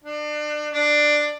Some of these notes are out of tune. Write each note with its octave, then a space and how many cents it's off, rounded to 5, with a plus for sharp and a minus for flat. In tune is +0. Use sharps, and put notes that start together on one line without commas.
D4 +30
D4 +10